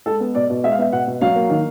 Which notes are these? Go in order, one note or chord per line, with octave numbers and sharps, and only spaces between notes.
G#3 A4
B3
B2 D5
B2
G#3 E5
F5
B3 E5
B2 F#5
B2
F#3 F5
A#3
D#3